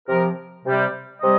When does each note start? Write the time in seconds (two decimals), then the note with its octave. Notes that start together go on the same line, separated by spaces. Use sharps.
0.08 C3 F3 A#4
0.65 C3 G3
1.22 C3 G3 D#5